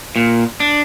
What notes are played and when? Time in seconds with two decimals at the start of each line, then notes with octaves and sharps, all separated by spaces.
0.16 A#2
0.60 D4